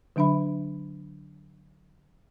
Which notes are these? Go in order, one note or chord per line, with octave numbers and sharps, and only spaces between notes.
D3 F#3 D4 E5 B5